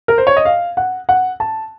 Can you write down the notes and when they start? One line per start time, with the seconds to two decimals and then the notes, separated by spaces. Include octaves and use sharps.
0.08 A#4
0.18 C5
0.27 C#5
0.37 D#5
0.45 F5
0.77 F#5
1.09 F#5
1.40 A5